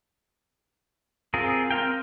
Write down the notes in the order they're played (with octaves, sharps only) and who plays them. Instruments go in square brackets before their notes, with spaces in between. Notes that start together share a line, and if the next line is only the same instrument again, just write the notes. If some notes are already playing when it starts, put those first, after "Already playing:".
[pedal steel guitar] C4 F4 G#4 A#4
C4 A#4 F5 G5